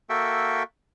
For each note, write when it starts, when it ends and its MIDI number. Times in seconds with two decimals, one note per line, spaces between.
0.10 0.63 58
0.10 0.63 66
0.10 0.63 69
0.10 0.63 76
0.10 0.63 79